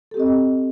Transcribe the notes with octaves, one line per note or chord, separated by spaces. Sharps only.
C4 G4 A4 D#5